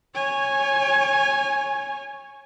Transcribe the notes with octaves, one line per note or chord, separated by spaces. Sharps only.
C#5 G#5